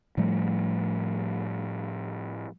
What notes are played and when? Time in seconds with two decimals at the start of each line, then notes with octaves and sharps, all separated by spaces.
0.17 A2 F3 G3 A3